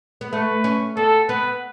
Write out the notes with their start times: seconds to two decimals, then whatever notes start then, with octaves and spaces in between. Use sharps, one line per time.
0.21 B3
0.32 A3 B4
0.64 C#4
0.96 B3 A4
1.29 B3 B4